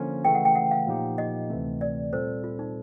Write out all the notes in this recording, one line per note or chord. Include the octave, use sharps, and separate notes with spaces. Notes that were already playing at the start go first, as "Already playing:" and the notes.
Already playing: D3 F3 A#3 C#4 F4
C#3 E3 A3 G5
F#5
G5
F#5
F5
A#2 F3 A#3 D#4 G4
D#5
D2 C3 E3 A3 C4
D5
A#2 G3 C4 F4 A4 C5
F4
D#4